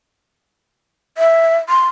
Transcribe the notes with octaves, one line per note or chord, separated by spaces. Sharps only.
E5
C6